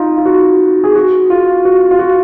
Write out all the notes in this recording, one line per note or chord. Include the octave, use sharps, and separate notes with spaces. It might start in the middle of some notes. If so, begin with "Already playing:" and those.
Already playing: D#4 F4
F4
F#4
G#4
F#4
F4
F#4
F4
F#4